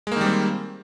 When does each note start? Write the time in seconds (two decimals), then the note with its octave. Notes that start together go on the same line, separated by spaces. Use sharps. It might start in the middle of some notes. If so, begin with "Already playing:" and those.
0.07 G#3
0.12 A#3
0.16 D#3
0.21 G3
0.26 C4